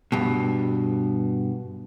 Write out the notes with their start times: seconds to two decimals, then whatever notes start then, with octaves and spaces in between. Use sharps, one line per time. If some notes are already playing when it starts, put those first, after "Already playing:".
0.12 G2 B2